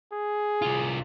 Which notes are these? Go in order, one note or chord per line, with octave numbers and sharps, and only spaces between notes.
G#4
C2 F4